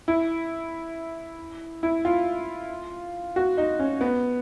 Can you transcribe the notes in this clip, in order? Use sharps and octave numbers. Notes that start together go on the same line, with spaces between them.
E4
E4
F4
F#4
D#4
C#4
B3